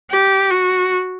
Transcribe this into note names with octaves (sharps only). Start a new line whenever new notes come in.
G4
F#4